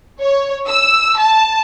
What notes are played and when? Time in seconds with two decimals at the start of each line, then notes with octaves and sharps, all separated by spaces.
0.21 C#5
0.68 E6
1.18 A5